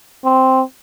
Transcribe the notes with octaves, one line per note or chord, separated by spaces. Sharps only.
C4